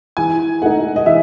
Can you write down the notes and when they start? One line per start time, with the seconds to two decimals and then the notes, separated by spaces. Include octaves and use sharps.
0.17 E3 G#5
0.62 A3 D#4 F#5
0.96 D#5
1.06 E3 E5